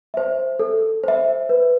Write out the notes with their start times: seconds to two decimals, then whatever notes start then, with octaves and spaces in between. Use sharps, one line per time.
0.14 C5 E5
0.59 A4
1.04 C5 E5
1.49 B4